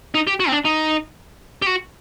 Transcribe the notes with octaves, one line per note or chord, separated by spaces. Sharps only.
D#4
G4
F#4
C4
D4
D#4
G4
F#4